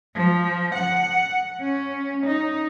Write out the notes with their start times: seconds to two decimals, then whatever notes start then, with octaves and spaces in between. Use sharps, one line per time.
0.15 F3
0.75 F#5
1.61 C#4
2.26 D#4